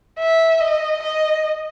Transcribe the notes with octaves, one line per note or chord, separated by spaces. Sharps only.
E5
D#5
D#5